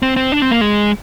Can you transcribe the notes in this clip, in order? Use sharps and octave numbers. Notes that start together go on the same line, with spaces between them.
C4
C4
D4
C4
A#3
G#3